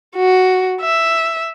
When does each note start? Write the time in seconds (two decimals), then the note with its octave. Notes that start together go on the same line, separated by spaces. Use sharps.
0.16 F#4
0.81 E5